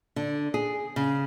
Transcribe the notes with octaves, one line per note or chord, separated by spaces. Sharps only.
D3
G#4
C#3